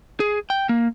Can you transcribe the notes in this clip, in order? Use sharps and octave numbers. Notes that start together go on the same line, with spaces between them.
G#4
G5
A#3